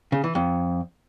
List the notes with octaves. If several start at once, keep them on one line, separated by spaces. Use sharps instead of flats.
C#3
E3
F2